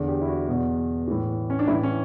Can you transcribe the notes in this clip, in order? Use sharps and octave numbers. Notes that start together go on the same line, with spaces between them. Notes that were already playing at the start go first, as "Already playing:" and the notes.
Already playing: E2 D3
G4
E4
F#4
E2 B2
A2 E3
C#4
D4
A2 E3 E4
C#4